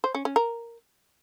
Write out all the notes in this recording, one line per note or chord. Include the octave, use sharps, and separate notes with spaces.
C5
C#4
C#4
A#4